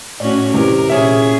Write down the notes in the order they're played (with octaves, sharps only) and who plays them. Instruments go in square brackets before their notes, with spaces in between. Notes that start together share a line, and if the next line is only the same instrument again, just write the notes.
[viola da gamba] A2 C#4 F#4 [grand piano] D5
[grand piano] C3 E3 [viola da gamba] A#4
[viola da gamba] A#2 G#4 [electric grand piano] C#4 E5